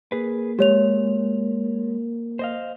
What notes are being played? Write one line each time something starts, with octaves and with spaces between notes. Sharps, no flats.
A#3 G#4 B4
G#3 G4 C#5 F7
C5 D#5 F5